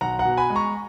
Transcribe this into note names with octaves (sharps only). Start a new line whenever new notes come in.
B1 F#5 A#5
F#5 A#5
B2
G#5 B5
G#3
A#5 C#6